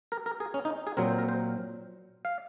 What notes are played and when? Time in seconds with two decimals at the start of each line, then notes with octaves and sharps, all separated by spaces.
0.12 A#4
0.26 A#4
0.40 G#4
0.54 C#4
0.65 D#4
0.87 G#4
0.97 A#2 F#3 C4 A#4
1.08 C5
1.18 A#4
1.29 C5
2.25 F5